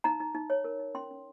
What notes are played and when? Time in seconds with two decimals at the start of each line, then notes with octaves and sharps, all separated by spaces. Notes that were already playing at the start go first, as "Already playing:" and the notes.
0.04 D#4 A#5
0.20 D#4
0.35 D#4
0.50 C#5
0.64 A#4
0.80 D#4
0.95 C#4 C6
1.11 C#4